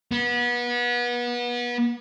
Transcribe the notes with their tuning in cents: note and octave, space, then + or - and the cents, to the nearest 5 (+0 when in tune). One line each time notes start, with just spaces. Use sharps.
B3 -30